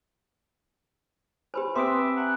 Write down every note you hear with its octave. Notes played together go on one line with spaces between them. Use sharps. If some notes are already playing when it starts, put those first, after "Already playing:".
G4 B4 C5 G#5 B5
C4 B4 E5 C6 D6 D#6 D7
F#5 G#5 A#5